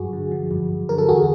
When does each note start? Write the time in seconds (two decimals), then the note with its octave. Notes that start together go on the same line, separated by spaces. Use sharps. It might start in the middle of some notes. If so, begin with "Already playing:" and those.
Already playing: G2 F#3 F#4 G#4
0.13 D3
0.32 F3
0.51 G2
0.70 G2
0.89 D3 A#4
0.98 A4
1.09 E2 F#4 G#4